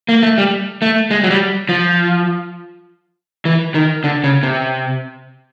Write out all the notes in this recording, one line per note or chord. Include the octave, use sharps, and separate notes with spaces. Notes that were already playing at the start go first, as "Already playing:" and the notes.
A#3
A3
G3
A3
G#3
F#3
G3
F3
E3
D#3
D3
C#3
C3